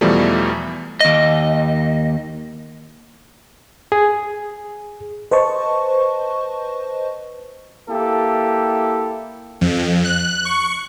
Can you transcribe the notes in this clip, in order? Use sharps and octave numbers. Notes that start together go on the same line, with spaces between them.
E2 B2 E3 F3 G3 A3
D#2 D#5
G#4
B4 C5 D#5 A5 C#6
A#3 E4 G4 A4
F2
F#6
C#6